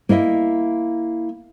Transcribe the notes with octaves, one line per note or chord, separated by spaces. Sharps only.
A#3 E4 D#5 E5